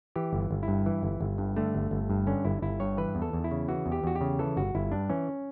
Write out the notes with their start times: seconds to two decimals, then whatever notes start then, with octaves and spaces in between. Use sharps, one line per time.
0.16 E3 G4
0.33 G1
0.51 G1
0.63 E4
0.68 G2
0.86 E3
1.03 G1
1.21 G1
1.38 G2
1.57 D3 A3
1.75 G1
1.91 G1
2.10 G2
2.27 D3 C#4
2.45 G1 E4
2.62 G1 E4
2.80 G2 C#5
2.97 E3 B4
3.15 E2
3.22 A4
3.33 E2
3.44 E4
3.51 C#3
3.68 E3 F#4
3.86 E2
3.92 G4
4.04 E2 F#4
4.16 G4
4.21 C#3
4.39 E3 A4
4.57 G1 F#4
4.75 G1 E4
4.92 G2 D4
5.10 E3 C#4